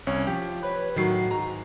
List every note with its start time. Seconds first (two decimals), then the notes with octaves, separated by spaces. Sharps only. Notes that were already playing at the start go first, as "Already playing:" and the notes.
0.07 C2 C#4 C#5
0.27 F3 G4
0.63 B4 C#5
0.96 A2 D#3 F#3 F#4 C7
1.31 G#2 A#5